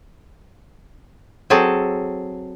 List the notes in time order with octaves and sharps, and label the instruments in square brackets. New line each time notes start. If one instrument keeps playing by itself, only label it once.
[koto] F#3 C4 G#4 A4